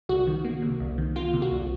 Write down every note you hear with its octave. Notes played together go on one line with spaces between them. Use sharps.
C2 F#4
D#3
A#3
C3
C2
D#3
A#3 F4
C3
F#4
C2